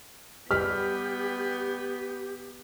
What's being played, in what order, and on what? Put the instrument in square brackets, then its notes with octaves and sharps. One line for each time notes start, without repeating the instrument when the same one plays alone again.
[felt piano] G3 B4 B6 [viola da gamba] B3 [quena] G4 [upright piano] F6